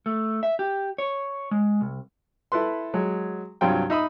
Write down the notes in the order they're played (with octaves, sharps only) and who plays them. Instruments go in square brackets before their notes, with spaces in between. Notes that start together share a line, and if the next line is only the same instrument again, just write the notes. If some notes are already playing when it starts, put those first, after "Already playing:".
[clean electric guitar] A3
E5
G4
C#5
G#3
C2
[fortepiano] E4 A4 B4 C6
F#3 G#3
C2 G2 F#3 F4 G5
D#4 E5 B5 D#6